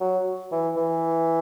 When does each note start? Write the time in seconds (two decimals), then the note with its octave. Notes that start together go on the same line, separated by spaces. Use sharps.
0.01 F#3
0.52 E3
0.76 E3